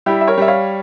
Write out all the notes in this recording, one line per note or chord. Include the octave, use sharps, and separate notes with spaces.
G3 E4 G4
E5
A#4 C#5
G3 E5
C#5 F5